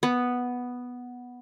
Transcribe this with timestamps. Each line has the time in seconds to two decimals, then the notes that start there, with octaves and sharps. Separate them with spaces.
0.03 B3